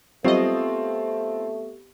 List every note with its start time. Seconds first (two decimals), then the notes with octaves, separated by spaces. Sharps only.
0.24 F#3 G3 A3 B3 C4 F4 G4 D#5